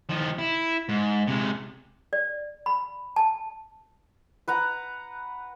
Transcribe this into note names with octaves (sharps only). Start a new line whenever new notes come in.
D#3 F3
E4
G#2
C3 G#3
D5
B5
A5
B4 F#5 A#5